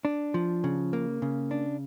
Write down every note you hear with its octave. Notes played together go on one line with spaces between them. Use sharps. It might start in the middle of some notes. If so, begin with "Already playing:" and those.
D4
F3
C#3
A#3
C#3
D4